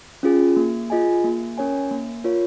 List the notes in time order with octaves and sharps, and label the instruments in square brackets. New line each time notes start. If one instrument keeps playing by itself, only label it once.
[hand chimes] C#4 F4 G#4
A#3
F4 G#4 D#5 G#5
A#3
C#4 A#4 C#5 G#5
A#3
F4 A#4 C#5